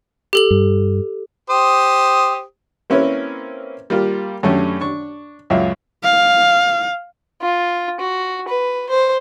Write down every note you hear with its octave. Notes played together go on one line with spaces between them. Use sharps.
G4 A4 F#7
G2
G4 C5 D#6
A#3 C4 C#4 E4 B4 C#5
G3 A#3 F4 G4
F#2 A3 C#4 D4 G4
D4 C#6
C#2 F#2 A#2 E5 F5
F5
F4
F#4
B4
C5